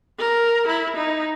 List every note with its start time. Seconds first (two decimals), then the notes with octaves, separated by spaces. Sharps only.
0.19 A#4
0.68 E4
0.96 D#4